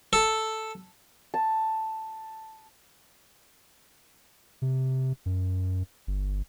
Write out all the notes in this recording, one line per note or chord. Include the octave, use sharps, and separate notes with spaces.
A4
A5
C3
F#2
G1